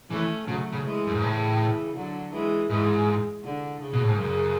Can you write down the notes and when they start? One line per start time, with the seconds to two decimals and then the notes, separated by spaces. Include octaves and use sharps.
0.10 E3 A3 C#4
0.47 C#3 F#3 A3
0.72 C#3
0.85 E3 G#3
1.07 F#2
1.14 G#2
1.22 A2 C#3 E3
1.95 D3 F#3
2.33 E3 G#3
2.70 G#2 E3 G#3
3.43 D3
3.80 C#3
3.93 B2
4.02 A2
4.09 G#2
4.17 F#2 C#3